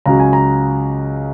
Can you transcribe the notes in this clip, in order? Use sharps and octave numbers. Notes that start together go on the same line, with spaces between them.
C#2 C#3 F#3 A#5
G#5
A#5